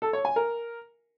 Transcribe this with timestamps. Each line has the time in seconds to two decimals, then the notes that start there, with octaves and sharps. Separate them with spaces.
0.02 A4
0.13 C#5
0.25 G#5
0.36 A#4